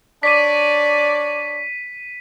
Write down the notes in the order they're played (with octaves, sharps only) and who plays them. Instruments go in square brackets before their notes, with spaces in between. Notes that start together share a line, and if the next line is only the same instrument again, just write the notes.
[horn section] D4 C#5 D5 [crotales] B6 D#7